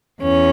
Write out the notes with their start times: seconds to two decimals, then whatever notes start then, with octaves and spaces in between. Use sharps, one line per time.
0.21 E2 C#4